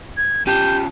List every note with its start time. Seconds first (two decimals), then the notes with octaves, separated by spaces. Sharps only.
0.17 G#6
0.47 C#4 F4 G4 A5 G6